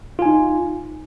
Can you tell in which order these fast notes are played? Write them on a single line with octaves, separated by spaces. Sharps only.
F4 G#5 D#4